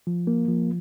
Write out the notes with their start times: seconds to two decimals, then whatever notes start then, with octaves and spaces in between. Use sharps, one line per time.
0.07 F3
0.27 A#3
0.48 F3